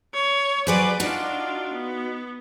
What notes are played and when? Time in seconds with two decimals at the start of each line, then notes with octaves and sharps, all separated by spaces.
0.14 C#5
0.67 F#3 G#4 B4 C5 D5
1.00 D4 D#4 F4 F#4
1.73 B3